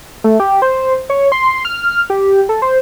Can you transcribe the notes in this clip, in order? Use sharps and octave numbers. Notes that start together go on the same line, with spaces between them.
A3
G4
C5
C#5
C6
F6
G4
A4
C5